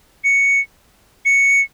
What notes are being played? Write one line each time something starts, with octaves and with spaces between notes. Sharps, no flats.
C#7
C#7